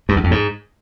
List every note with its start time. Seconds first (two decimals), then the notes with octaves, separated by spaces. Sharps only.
0.09 G2
0.16 E2
0.24 F2
0.31 G#2